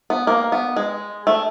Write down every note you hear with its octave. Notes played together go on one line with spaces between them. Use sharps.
B3
A#3
B3
G#3
A3